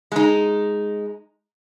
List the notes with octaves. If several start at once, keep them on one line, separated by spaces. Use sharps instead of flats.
G#3 D#4